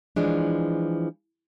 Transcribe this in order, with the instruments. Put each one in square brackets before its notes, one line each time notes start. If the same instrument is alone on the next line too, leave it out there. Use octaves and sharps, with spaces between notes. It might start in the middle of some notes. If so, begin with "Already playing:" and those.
[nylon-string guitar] E3 F3 G#3 D4